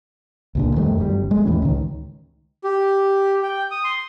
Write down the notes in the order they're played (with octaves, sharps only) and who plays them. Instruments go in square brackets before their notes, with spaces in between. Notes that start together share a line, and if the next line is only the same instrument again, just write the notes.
[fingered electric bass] C#2 A#2 D3
F2 D#3 G3 A3
G1 F#2 A#2 G3
G#3 A3
D#2 A2 E3 C#4
C#2 D#3
[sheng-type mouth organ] G4
G5
D#6
C6